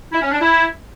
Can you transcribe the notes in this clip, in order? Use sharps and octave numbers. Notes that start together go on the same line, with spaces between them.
E4
C#4
D4
E4